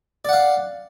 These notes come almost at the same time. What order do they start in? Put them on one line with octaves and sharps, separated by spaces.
D5 F#5 F5